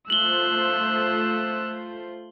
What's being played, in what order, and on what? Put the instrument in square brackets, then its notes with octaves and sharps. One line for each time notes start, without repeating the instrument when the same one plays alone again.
[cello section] A3 F4 C5 [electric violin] E6 F#6 [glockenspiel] F#7 G7